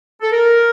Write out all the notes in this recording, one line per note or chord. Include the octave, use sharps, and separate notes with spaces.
A4
A#4